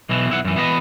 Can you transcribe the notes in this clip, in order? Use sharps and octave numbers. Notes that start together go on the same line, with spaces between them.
B1 B2 E3
B1 E4 F#5
F#2 E3
E3 B3 F#4 B4 D#5